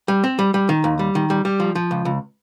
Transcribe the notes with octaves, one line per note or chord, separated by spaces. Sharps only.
G3
C4
G3
G3
D#3
D#2
G3
D#3
G3
G3
F3
F3
C#2
C#2